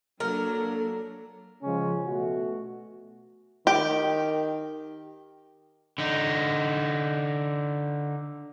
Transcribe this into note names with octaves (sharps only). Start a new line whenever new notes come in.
F#3 A#3 D4 A4 A#4
C#3 F3 G#3 C#4
B2 A3 F#4
D#3 G4
D3 D#4